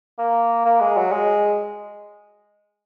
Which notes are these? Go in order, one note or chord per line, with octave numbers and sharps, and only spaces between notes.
A#3
A#3
G#3
F#3
G#3